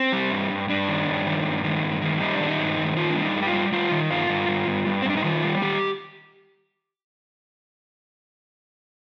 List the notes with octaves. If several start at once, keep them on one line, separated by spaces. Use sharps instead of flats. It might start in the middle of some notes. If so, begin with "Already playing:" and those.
Already playing: C4
G3
G2
G2
G2 D4
D#3
G2
D#3
G2
D#3
G2
D#3
G3 D#4
D4
D#3
D#4
G2
D#3
D#3 F4
D4
G3
D#4
G2
G4
F4
G3
G3 F4
D#3
G2 F4
G2
G2
G2
G2
C4
G2 D4
D#4
D#3 F4
G3
D#3 G4